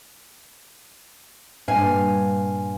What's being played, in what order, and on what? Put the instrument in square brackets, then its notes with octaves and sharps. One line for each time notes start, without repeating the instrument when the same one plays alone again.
[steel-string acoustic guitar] G2 A#2 F5 G#5